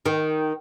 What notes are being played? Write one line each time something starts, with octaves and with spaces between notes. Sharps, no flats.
D#3